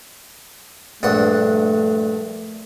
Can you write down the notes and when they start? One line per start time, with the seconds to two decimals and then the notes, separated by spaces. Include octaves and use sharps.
1.03 A#1 G2 A3 F#5